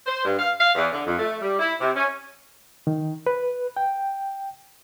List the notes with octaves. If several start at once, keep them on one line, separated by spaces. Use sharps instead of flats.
C5
G2
F5
F5
E2
D3
F2
A3
G3
E4
C3
C#4
D#3
B4
G5